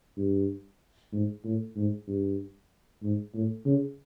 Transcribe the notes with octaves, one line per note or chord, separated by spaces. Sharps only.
G2
G#2
A2
G#2
G2
G#2
A2
C#3